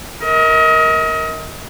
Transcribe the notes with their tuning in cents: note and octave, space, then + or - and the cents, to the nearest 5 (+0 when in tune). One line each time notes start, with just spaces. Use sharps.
A#4 +0 D#5 +35